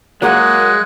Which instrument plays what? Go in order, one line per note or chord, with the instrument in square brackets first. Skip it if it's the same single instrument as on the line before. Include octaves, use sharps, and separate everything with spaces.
[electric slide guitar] F#3 G#4 F#5 [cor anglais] G#3 [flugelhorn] A#3 [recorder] F#6